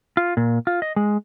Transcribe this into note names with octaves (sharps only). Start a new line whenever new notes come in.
F4
A#2
F4
D#5
G#3